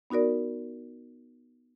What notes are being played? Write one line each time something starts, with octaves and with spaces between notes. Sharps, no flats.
B3 D#4 F#4 A#4 D5